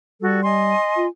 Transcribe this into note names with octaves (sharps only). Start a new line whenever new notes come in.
G3 F#4 A4
D#5 G#5 C6
F4